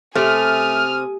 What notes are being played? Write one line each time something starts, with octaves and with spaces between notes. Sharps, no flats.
C3 A3 G#5 D#6 F6